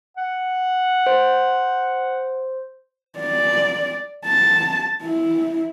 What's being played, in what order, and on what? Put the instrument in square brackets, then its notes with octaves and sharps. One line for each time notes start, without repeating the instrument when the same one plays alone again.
[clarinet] F#5
[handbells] C5
[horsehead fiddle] D5
A5
E4